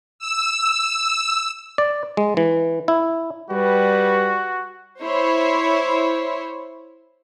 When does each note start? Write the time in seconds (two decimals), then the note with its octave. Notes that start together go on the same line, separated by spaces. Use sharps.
0.19 E6
1.78 D5
2.17 G#3
2.37 E3
2.88 E4
3.50 G3 F#4 B4
5.01 E4 C5 C#5